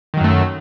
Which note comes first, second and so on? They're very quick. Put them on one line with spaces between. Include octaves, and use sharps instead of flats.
D#3 F#3 F#2 A3